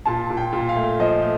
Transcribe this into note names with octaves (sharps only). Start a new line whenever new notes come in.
A#2 A5
A#2
G5
A#2
F5
A3
F3 D#5
A3